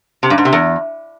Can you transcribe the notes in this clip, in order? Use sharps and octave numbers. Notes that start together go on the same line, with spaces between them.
C3
G2
G#2
C3
E2